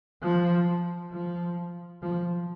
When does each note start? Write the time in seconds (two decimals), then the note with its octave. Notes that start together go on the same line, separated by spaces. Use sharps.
0.22 F3
1.12 F3
2.02 F3